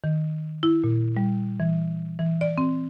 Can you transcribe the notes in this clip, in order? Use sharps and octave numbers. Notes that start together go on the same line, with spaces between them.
D#3
E4
A#2
G3
E3
E3
D5
C4